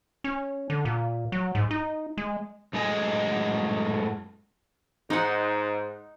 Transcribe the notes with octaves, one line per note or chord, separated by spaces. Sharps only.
C#4
D3
A#2
F#3
G#2
D#4
G#3
F#2 A2 G#3 D#5 G#5
G#2 D#4 F#5